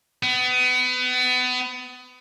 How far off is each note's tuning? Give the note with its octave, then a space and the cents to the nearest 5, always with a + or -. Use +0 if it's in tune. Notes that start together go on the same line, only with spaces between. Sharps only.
B3 +30